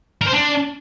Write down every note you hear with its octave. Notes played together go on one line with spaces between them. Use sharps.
A#4
C5
D4